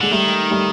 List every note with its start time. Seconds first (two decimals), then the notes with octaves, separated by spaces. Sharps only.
0.01 D3 G#3
0.11 D#3 G3 A3
0.51 G3 A3